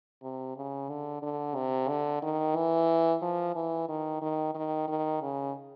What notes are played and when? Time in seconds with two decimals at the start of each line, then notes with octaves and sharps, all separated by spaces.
0.22 C3
0.57 C#3
0.89 D3
1.22 D3
1.55 C3
1.89 D3
2.22 D#3
2.56 E3
3.21 F3
3.55 E3
3.88 D#3
4.21 D#3
4.55 D#3
4.88 D#3
5.22 C#3